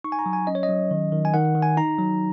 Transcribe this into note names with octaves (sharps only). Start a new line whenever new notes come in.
D#4 C#6
G#5
A#5
F#3
G#5
C#4 D#5
C#5
D#5
F#3
D#3
D#3
G#5
D#3 F#5
D#3
G#5
D#4 A#5
F#3